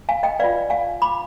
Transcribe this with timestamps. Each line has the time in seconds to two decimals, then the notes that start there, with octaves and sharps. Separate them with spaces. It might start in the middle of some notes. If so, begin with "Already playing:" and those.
0.09 F5 G#5
0.23 D#5 G5
0.39 F4 B4 D5 F5
0.70 F5 G#5
1.02 B5 D6